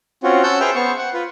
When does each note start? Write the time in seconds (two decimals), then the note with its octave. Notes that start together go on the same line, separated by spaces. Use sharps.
0.23 C4 C#4 F4 F#4
0.44 C#4 F#5 A5 E6 G6
0.60 G#4 B4 C5 E5 G5 F6
0.75 B3 C5 C#6
0.98 F#5
1.14 F4 B4